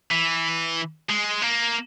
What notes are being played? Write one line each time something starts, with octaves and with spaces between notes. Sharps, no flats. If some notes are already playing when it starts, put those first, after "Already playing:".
E3
G#3
A#3